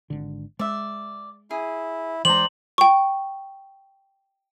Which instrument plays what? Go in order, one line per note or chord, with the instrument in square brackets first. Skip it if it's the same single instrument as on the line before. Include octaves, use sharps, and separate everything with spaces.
[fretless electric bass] G#1 D3
[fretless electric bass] G#3 [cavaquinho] D5 E5
[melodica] E4 [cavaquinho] G#4
[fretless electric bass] E3 G#3 [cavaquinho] C5 A#5 [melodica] D5 G5 [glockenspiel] F#7
[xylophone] G5 C#6